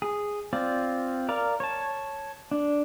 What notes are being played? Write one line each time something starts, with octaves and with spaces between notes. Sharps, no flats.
G#4
C4 F4 D5
A#4 D5 F5
C#5 A5
D4